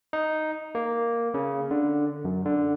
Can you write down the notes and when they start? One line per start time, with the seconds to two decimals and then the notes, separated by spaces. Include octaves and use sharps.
0.13 D#4
0.75 A#3
1.34 C#3
1.71 D3
2.25 F#2
2.46 D3